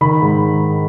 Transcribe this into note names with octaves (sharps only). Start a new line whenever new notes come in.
D#3 B5
G#2